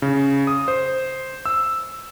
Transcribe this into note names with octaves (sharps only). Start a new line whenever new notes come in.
C#3
D#6
C5
E6